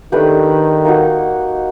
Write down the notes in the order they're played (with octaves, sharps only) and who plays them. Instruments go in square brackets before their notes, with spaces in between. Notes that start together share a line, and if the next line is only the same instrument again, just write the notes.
[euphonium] D#3 [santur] A3 D4 G4 B4
[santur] A#3 D#4 F#4